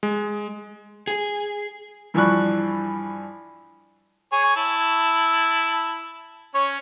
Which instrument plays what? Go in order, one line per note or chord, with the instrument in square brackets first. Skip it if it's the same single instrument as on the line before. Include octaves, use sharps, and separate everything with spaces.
[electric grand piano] G#3
[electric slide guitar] G#4
[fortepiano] G2 E3 F3 D5 C#6 F#6
[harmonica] G#4 C#5
E4 A5
C#4 C#5